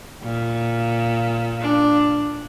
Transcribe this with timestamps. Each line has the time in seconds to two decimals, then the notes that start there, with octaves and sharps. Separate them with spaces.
0.23 A#2
1.61 D4